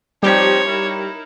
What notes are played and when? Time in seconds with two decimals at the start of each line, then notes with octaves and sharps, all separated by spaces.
0.23 F3 G3 C4 D#4 G4 C#5
0.69 D#4 E4 A#4